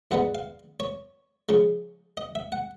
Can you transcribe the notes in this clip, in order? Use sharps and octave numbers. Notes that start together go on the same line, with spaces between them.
G#2 E3 G3 B3 D#4 F#5
F5
C#5
C#3 F3 G#3
D#5
E5
F#5